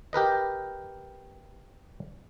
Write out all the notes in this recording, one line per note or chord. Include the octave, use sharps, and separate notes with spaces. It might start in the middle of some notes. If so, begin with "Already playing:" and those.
G4 A#4 B4 D#5